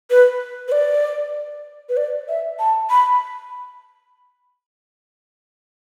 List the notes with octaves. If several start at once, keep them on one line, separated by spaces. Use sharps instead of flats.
B4
B4
D5
B4
D5
E5
A5
B5